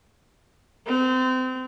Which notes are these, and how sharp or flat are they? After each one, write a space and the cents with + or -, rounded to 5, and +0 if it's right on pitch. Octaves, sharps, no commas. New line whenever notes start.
C4 -30